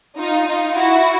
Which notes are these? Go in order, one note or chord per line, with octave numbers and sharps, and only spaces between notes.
D#4 F4
D#4 F4
E4 F#4